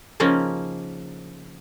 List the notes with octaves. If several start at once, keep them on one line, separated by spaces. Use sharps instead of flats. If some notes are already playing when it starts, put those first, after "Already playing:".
C#3 F3 A#3 C#4 D#4